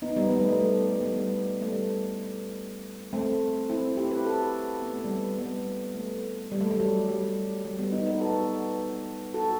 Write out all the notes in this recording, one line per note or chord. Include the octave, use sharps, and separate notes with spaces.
B3 D#4
G3 B3
G3 B3
A3
G3
A3
A3
G3 B3
G3 B3
A3
G3
A3 C4
C4 E4
E4 G4
G4 B4
F#4 A4
B3
A3
G3 B3
G3 B3
A3
G3
A3
G3
F#3
G3
G3
G3 B3
B3 D#4
B3 D#4
F#4 A4
F#4 A4